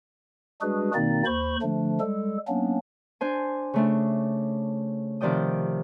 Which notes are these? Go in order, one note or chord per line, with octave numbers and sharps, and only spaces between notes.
G3 G#3 D4 F#4 G#4 B4
B2 D#3 A#3 C4 D#4 D5
D#2 C5 B5 C#6
D3 F3 A3 D4
G3 G#3 A4
F#3 A#3 B3 C#4 D4
D4 C5 G#5
C#3 A3 D4
C3 D#3 F3 D5 G5 D#6